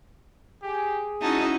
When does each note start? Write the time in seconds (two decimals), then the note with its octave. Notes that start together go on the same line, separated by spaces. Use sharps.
0.63 G4 G#4
1.22 C#4 D#4 E4 F#4 A5